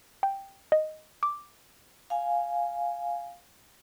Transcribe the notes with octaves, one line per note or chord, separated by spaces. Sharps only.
G5
D#5
D6
F5 G#5